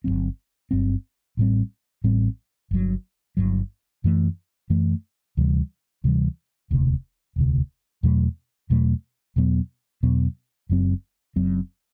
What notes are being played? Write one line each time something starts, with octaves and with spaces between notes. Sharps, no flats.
G1 G2 F#3 C4
G1 G2 F#3 C4
A1 A2 G3 C4
A1 A2 G3 C4
G1 G2 F#3
G1 G2 F#3
F#2 E3 A3
F#2 E3 A3
D2 C3 E3 G3
D2 C3 E3 G3
E1 D2 C3
E1 D2 C3
E2 B2 F#3 A3
E2 B2 F#3 A3
E2 B2 F#3 B3
E2 B2 F#3 B3
F#1 F#2 F#3 C4
F#1 F#2 F#3 C4